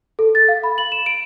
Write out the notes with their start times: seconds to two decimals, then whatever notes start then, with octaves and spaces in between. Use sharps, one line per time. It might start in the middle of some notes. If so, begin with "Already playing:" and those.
0.19 A4
0.35 A6
0.48 F5
0.64 B5
0.78 F#7
0.92 E7
1.06 D7